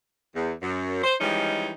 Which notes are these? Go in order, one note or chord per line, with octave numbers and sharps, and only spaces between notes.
E2
F#2
C5
E3 F3 G3 G#3 C#4 D#4